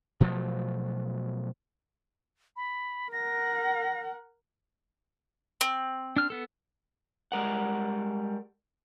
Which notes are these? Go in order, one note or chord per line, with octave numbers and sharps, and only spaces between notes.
B2 F3 F#3 A3
B5
A#4 F#5 A#6
C4
D4 F6
B3 A4
G3 G#3 A#4 F#5